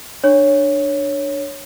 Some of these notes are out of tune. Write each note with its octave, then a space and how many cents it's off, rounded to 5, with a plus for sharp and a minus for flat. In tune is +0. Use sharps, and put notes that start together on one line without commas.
D4 +15 C#5 +0